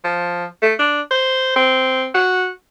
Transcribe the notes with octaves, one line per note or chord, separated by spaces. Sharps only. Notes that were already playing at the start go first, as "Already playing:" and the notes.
F3
A3
D4
C5
C4
F#4